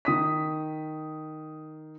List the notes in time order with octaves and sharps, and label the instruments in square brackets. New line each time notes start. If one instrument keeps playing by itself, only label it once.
[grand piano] D#3 D#6 B6